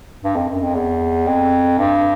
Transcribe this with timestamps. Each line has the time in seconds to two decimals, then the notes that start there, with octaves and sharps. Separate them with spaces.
0.23 G2
0.35 F2
0.50 F#2
0.62 F2
0.75 E2
1.27 F2
1.79 G2